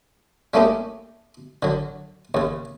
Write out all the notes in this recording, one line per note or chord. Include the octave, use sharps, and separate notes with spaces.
G3 A3 A#3 C#4 D#4 G4
D3 F#3
D#2 C#3